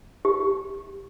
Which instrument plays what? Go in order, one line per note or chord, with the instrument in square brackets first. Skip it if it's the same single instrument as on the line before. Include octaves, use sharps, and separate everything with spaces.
[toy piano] G4